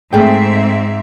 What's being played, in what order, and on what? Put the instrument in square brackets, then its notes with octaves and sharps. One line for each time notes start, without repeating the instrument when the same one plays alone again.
[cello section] G#2 C4 E5 [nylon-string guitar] A3 G#4 G5